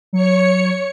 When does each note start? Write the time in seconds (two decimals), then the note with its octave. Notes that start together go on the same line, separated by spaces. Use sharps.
0.13 F#3 C#5 C#7